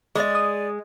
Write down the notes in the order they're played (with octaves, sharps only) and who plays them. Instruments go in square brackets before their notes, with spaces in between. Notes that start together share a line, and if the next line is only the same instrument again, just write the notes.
[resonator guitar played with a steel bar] G#3 [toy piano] G#4 D#5 [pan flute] D5
[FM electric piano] D#6